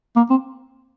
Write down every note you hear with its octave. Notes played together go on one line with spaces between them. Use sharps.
A#3
C4